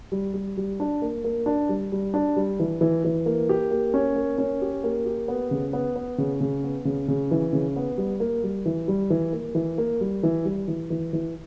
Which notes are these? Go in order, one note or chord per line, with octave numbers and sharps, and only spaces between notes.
G3
G3
G3
D4
A#3
A#3
D4
G3
G3
D4
G3
E3
E3
E3
A#3
G4
A#3
C#4
A#3
C#4
G4
A#3
G4
B3
C#3
B3
B3
C#3
C#3
B3
C#3
C#3
E3
C#3
B3
G3
A#3
G3
E3
G3
E3
A#3
E3
A#3
G3
E3
G3
E3
E3
E3